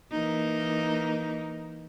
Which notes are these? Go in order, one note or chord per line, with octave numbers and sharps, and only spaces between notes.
E3 A#3 D#4